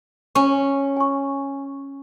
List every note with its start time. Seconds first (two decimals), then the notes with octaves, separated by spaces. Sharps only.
0.35 C#4 C#6
0.97 G#5 C#6